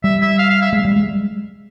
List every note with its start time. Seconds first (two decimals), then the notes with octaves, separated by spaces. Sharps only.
0.04 G3 E5
0.22 E5
0.38 F5
0.50 F5
0.62 E5
0.73 G#3
0.85 G3
0.96 G#3